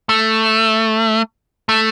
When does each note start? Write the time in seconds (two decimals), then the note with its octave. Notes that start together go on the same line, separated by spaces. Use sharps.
0.09 A3
1.69 A3